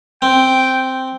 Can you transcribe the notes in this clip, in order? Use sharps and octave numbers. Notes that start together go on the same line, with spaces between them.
C4 G5